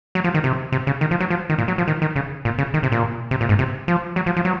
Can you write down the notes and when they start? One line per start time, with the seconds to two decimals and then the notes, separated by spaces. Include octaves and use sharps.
0.15 F#3
0.24 F3
0.34 D#3
0.44 C3
0.72 C3
0.87 C#3
1.01 D#3
1.11 F3
1.20 F#3
1.30 F3
1.50 D#3
1.59 A#2
1.68 F#3
1.78 F3
1.88 D#3
2.02 D#3
2.16 C#3
2.45 A#2
2.58 C#3
2.74 D#3
2.83 C3
2.92 A#2
3.31 C3
3.41 A#2
3.49 G#2
3.59 C3
3.88 F3
4.16 F#3
4.26 F3
4.36 F3
4.45 F#3